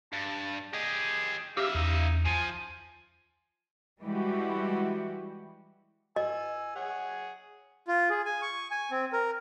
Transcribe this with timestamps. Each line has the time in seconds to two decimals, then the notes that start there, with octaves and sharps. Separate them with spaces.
0.13 G2 A5
0.74 G4 G#4 D#5
1.57 C#3 G4 E5 F5 E6
1.75 E2 D#4
2.26 F3 G#5
4.02 E3 G3 G#3 E4 F#4 G4
6.16 D#5 G#5 E6
6.76 G#4 C#5 F#5
7.88 F4
8.10 G#4
8.25 G#5
8.42 C#6
8.71 G#5
8.91 C4
9.13 A#4